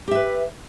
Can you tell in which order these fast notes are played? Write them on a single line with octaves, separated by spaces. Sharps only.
G4 E5 B4